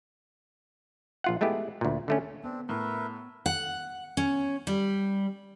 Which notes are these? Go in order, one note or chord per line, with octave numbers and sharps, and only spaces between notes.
A#1 F4 F#5
G#3 A3 B3 E4 G4
D2 A#2
D3 A3 C#4
B3 C4 D4
A2 A#4 B4 E5
F#5
C#4
G3